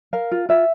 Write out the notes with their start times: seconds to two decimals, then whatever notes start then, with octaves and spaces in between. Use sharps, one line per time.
0.13 A#4 F5
0.31 F4
0.49 F4 E5